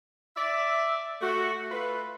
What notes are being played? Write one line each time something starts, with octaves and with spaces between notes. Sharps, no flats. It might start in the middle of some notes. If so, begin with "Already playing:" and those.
D5 E5
A3 F#4
A3 F4 B4